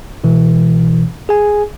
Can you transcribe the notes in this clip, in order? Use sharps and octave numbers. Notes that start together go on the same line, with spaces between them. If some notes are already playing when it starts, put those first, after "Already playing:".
C#2 B2 E3
G#4 G#5